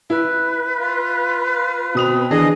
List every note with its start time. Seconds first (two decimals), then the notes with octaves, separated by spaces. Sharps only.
0.10 E4 B4
0.79 F4
1.95 B2 C4 D#6 F7
2.31 E3 D4 G#4 D#5